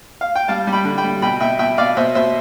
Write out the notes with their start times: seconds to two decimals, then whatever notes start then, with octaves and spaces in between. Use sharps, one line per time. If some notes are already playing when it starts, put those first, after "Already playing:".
0.21 F5
0.36 G5
0.48 G3 F5 A5
0.67 G3
0.72 G5 B5
0.85 D3
0.98 G5 B5
1.04 G3
1.22 B2 G5 B5
1.40 B2 E5 G5
1.59 B2 E5 G5
1.78 B2 D5 F5
1.97 B2 C5 E5
2.15 B2 C5 E5